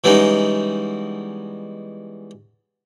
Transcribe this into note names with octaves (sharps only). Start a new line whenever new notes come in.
E3 G3 G#3 B3 C#4 D#4